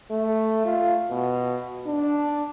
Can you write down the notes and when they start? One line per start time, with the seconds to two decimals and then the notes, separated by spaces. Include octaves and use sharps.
0.11 A3
0.65 F4
1.10 B2
1.86 D4